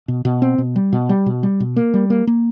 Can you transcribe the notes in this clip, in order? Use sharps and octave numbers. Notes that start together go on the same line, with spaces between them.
B2
B2
C4
B2
G3
B2
G3
B2
G3
B2
A#3
G3
A#3
A#3